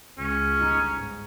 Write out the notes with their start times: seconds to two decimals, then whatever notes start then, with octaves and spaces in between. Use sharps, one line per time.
0.18 C#2 C#4
0.57 G1 D#4
0.94 G#2